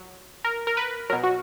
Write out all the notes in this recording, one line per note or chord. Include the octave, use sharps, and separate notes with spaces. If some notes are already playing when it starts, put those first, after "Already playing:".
Already playing: F#3
A#4
A#4
B4
B2 F#3 A#4
F#4